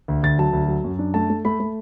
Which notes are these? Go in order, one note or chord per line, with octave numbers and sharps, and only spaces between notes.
D2
D2 A6
F#3 A5
D2
F#3
F#2
D4
A3 A5
A3
A3 B5
A3